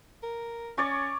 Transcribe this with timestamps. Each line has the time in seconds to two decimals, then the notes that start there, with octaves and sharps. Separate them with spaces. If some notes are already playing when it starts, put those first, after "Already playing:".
0.23 A#4
0.78 C#4 C#5 D5 C#6